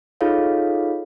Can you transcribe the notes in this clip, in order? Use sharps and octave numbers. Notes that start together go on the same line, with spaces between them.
D#4 F4 G#4 A4 C#5 F5